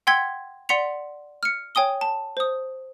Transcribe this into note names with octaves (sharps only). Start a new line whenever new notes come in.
F#5 G5 C6 E6 G#6 B6
D5 F#5 C6 B6 C#7 F7
F6 C#7
C#5 G5 G#5 D#6 G7
A5
C5 D#6